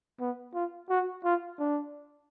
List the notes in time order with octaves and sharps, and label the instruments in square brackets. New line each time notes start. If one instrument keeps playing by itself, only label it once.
[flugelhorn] B3
F4
F#4
F4
D4